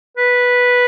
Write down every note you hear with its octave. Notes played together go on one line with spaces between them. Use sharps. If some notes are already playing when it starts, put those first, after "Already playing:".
B4